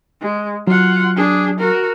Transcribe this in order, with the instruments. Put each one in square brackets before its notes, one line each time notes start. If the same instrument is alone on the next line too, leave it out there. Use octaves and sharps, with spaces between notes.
[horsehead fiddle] G#3
[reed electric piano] F#3 [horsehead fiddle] F4 F#5
[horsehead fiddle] D4 G#4
F#4 A#4